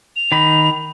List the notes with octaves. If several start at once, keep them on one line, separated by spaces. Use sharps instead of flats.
F7
D#3 B5